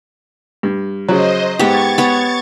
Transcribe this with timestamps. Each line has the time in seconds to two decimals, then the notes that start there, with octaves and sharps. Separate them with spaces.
0.63 G2
1.08 C#3 F#3 C5 D#5
1.59 G#2 B3 G4 C#6 G#6 A6
1.98 B3 C#5